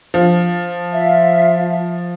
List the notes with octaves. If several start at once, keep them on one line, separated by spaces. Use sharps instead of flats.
F3
F4 E5 F5